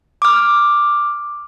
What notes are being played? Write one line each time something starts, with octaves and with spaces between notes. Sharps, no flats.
D6 F6